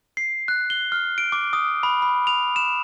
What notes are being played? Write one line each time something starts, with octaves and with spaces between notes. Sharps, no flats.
C7
F#6
G7
F6
D7
D6
D#6
B5
B5
F7
E7